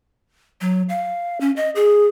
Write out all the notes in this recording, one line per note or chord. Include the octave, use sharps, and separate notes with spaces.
F#3
F5
C#4
D#5
G#4